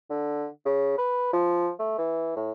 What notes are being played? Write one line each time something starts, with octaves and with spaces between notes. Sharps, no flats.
D3
C#3
B4
F3
A3
E3
A2